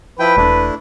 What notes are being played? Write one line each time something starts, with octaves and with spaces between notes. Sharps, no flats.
F3 E4 B4 G5
E1 A3 D4 E4